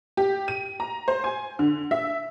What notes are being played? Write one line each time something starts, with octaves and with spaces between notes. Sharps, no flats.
G4
D#7
A#5
C5
G#5
D3
E5